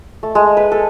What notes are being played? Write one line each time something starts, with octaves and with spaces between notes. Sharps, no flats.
A3
G#3
B4
A4